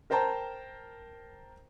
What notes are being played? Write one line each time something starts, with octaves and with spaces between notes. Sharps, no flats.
A#4 C5 G5 A5 A#5